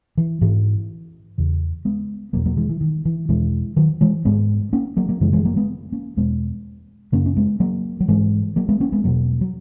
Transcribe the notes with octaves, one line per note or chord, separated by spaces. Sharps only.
E3
G#2 E3
E2 C#3
G#3 B3
E2 B2 F#3 A#3
F#3 A#3
E3 G#3
E3
D#3
E3
E2 B2 E3 G#3
D#3 F#3
E3 G#3
G#2 G#3 B3
A#3 C#4
F#3 A#3
F#3 A#3
F#2 C#3 E3 G#3
E3 G#3
F#3 A#3
G#3 B3
A#3 C#4
E2 B2 G#3 B3
F#2 C#3 A#3 C#4
C#4
G#3 B3
F#3 A#3
F#3
G#2 E3 G#3
F#3 A#3
G#3 B3
A#3 C#4
G#3 B3
E2 B2 F#3 A#3
F#3